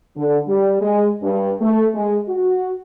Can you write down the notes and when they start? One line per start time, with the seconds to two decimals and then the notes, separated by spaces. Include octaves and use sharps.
0.17 D3
0.47 G3
0.81 G#3
1.23 G2
1.61 A3
1.95 G#3
2.29 F#4